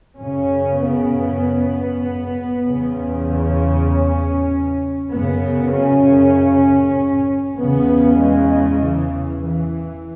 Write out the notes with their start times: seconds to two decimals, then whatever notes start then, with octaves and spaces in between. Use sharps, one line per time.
0.18 F#2 C#3 C#4
0.80 B3
2.65 E2 C#3
3.26 C#4
5.11 F#2 C#3 B3
5.73 C#4
7.57 E2 C#3 B3
8.19 G#3
8.81 E3
9.43 E3